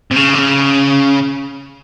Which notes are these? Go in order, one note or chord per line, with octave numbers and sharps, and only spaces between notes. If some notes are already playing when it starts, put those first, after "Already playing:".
C3
C#3
D3
C#3